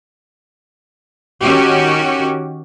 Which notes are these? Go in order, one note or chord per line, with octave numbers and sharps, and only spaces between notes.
D#3 C#4 F#4 G4